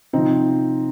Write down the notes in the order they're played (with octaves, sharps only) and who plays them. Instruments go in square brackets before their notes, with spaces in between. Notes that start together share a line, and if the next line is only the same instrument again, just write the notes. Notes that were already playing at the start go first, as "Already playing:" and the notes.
[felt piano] C3 F3 C4 D#4